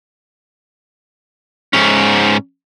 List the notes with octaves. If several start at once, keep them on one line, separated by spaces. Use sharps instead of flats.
G#2 C#4